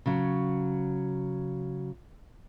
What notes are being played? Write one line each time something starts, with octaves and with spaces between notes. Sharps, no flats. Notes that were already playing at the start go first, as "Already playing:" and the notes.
C#3 F#3